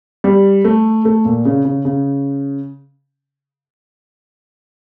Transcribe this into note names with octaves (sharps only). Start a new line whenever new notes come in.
G3
A3
A3
A#2
C#3
C#3
C#3